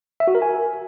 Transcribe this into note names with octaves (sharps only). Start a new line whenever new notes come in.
E5
F#4
A#4
G#5